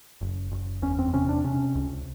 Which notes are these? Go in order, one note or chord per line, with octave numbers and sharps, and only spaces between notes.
F#1
F#1
E2 C#4
C4
C3 C#4
D4
C3 C#4
C#2